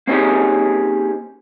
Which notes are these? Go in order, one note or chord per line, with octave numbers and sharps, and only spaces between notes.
A#3 C4 C#4 D#4 G4 G#4